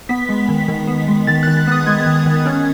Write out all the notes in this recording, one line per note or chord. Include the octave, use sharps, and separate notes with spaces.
B3 B6
G#3
D#3
D#3
B3
G#3
D#3 A6
D#3 F#6
A6
B3 D#6
G#3 G#6
D#3
D#3
C#4